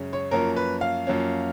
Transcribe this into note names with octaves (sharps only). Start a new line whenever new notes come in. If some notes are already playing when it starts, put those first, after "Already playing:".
Already playing: F#2 C#3 G#3 C#4
C#5
F#2 F3 A#3 C#4 A#4
B4
F5
F#2 F3 A#3 C#4